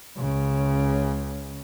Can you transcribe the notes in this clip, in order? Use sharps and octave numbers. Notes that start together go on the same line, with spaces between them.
C#2 C#3